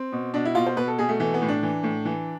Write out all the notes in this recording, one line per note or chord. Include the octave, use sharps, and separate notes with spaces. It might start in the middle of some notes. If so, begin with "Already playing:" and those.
Already playing: C4
B2
B2 D4
E4
B2 F4
C5
B2 B4
A4
B2 G#4
A3
E3 A3
B3
A2
D4
E3
A2
E3